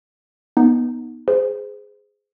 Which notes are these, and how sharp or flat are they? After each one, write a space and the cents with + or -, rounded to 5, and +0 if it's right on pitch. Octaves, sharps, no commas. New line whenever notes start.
B3 -15 D#4 +0
G#4 +0 C5 -30